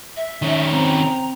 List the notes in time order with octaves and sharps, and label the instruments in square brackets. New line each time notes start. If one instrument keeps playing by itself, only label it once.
[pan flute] E5
[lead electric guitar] D#3 C#4
[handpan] C4 [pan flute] A#5